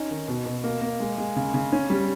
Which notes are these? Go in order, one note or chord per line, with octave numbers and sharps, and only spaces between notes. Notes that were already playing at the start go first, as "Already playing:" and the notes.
Already playing: C#4 D#4
D#3
B2
B2
A#3
A#3
G#3
G#3
C#3
C#3
C#4
G3